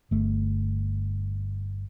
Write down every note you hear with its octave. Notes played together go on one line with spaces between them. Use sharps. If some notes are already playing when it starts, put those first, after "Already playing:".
G1 A3